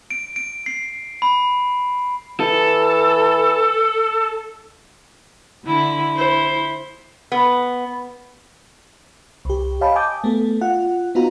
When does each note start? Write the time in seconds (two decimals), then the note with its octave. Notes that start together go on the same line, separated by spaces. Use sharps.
0.11 D7
0.36 D7
0.66 C7
1.22 B5
2.40 E3 A4
5.65 D3 E4
6.16 E4 C5
7.32 B3
9.45 C2 G4
9.81 C#5 D#5 F5 G5 A5 B5
9.96 G#5 A5 D6 D#6 G6
10.24 A3 B3 A4
10.61 F4 F#5
11.15 B3 D#4 F4 F#4 A#5